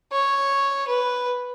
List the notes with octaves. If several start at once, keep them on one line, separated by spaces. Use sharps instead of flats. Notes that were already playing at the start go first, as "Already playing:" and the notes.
C#5
B4